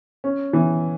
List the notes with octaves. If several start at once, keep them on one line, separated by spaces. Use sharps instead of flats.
C#4
E3